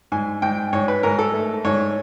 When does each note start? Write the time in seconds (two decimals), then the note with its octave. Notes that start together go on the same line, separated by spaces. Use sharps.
0.12 G#2 G#5
0.42 G#2 G5
0.73 G#2 C#5
0.88 B4
1.03 G#2 A#4
1.19 A4
1.34 A3
1.65 G#2 C#5